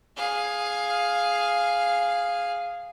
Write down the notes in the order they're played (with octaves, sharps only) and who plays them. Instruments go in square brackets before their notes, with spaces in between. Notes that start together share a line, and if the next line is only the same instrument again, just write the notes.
[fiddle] G#4 F5